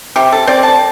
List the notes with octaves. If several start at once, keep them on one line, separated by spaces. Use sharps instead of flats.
C3 G4
A4
C4 D5
A5